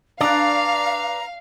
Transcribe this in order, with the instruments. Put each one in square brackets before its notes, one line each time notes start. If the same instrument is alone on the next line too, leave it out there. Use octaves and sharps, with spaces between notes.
[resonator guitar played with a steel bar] D4 [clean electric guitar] B4 D5 [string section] F5 [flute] A#5